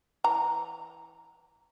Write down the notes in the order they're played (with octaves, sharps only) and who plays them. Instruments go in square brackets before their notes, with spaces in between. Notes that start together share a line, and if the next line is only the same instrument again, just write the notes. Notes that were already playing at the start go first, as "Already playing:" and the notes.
[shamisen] E3 A#5